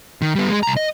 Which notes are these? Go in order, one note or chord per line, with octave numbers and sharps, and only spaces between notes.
D#3
G3 B3
G#3 G#4
C2 A#5
D#5